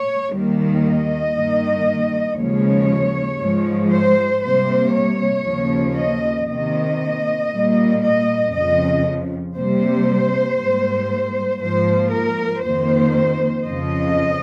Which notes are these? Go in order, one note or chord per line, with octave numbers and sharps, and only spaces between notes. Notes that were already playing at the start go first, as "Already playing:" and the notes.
Already playing: C#5
D#2 D#3 G3 A#3
D#5
G2 D#3 A#3
D#2 C#3 F3 G#3 C#5
G#2 F3 G#3
C5
C3 G3 A#3 C5
C#5
D#2 C#3 F3 A#3
D#5
C3 D#3 A#3 D#5
A#2 G3 A#3
D#5
F2 C#3 F3 D#5
C3 G3 A#3 C5
G#2 G3 A#3
G#2 F3 A#3 C5
A#4
F2 D#3 A#3 C5
F2 C#3 F3 D#5